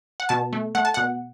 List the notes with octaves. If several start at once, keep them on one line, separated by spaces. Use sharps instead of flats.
F#5
B2 A5
A3
A3 F#5
A5
B2 F#5